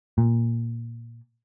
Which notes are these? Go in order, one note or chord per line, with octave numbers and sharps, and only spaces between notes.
A#2